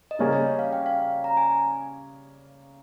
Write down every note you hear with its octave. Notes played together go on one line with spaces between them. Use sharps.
D#5
C#3 G3 A#3 C#4 G#4 C#5
C#5
F5
G5
F5
A#5
G#5